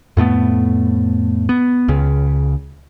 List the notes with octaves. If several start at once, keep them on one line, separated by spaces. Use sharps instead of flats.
F2 A2 A3 B3
B3
C#2 C#3